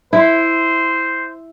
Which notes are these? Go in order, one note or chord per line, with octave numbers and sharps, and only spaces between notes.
E4 C5